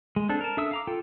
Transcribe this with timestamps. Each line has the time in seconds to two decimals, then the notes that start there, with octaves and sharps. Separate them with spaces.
0.16 G#3
0.29 C4 D4 A4
0.41 A#4 A5
0.57 D4 A4 E5 D#6 E6
0.71 F5 A#5 D6
0.87 F4 A4 G5